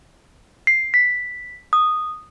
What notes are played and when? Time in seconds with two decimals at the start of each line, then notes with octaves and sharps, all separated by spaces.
0.67 C7
0.94 B6
1.73 D#6